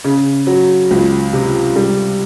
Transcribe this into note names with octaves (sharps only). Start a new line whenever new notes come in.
C#3
F#3
C#2
C3
G3